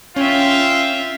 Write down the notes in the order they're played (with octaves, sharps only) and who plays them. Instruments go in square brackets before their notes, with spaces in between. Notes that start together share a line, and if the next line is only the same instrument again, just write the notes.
[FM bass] C#4 [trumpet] F4 [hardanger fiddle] E5 G5